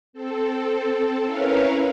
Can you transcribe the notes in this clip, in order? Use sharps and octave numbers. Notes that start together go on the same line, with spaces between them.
C4 A4
C#4 E4 A#4 B4 C#5 F5